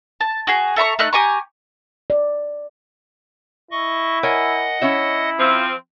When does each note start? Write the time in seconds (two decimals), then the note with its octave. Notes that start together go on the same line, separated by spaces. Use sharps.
0.21 A5
0.47 F#4 G#4
0.76 A4 E5 A#5 C#6
0.99 A3 D#4 F#6
1.13 G4 G#5 A#5 C#6
2.10 D5
3.71 E4 D#5 C#6
4.23 A#4 C#5 D#5 F#5 G#5
4.82 C#4 E4 C#5 E5
5.39 F3 C4